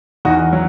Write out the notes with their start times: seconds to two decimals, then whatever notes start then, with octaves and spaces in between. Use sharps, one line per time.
0.25 E2 D#4 F#4
0.53 F#3